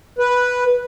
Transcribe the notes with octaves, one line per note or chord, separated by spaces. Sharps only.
B4